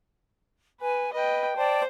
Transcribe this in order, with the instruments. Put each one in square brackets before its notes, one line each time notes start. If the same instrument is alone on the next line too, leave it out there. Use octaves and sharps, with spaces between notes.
[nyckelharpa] B4 [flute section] G#5
[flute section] B4 [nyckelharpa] D#5 G5
[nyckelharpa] C5 [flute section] D5 G5 A5